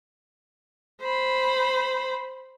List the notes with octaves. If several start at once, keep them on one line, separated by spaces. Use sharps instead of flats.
C5 B5